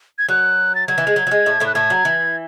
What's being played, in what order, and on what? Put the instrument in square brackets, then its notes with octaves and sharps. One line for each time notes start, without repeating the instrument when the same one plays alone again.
[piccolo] G#6
[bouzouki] F#3 [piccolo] F#6
[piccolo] A6
[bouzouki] F#3 [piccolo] G#6
[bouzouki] E3
G#3
F#3
F#3
G#3
A2 A3
A2 A3
[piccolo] F#6
[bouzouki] A2 A3 [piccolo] G#6
[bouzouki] F#3
E3